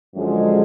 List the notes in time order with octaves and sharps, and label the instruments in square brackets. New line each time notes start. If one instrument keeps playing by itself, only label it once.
[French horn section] F#2 D3 F3 G#3